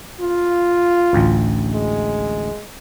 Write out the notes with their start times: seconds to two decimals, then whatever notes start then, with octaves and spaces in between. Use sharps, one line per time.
0.21 F4
1.13 A1 D2
1.73 G#3